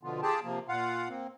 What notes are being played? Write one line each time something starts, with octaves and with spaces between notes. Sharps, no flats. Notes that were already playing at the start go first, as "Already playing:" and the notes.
B2 D3 F3 B3 F4
F4 G4 G#4 G5 A5
C3 F3 A#3
A#2 F4 F5 F#5
A#3 C4